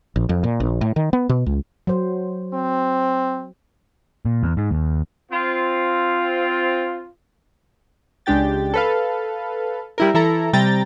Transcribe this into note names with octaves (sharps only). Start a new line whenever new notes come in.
A#1
F2
A#2
A#1
A2
D#3
B3
B2
C#2
F#3 C5
C4
A#2
E2
G#2
D#2
C4 F4
C#2 G#3 D4 G4 G5 A6
A4 B4 F5
G3 E4 A#4
E3 E4 A4 A#5
C3 G3 G5 A#5 A6